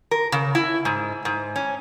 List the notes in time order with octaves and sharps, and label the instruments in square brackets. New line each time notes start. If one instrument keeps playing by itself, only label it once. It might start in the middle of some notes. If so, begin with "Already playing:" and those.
[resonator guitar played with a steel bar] A#4
C#3
E4
G#2
G#2
C#4